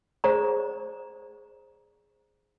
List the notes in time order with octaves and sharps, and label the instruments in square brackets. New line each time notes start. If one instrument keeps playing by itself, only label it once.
[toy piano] G#4 C5 D5 A#5 C#6